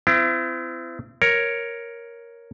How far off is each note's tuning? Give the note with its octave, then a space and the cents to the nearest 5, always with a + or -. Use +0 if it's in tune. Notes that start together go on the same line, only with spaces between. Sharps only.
C4 -35 E4 +35
A#4 +5 C#5 +0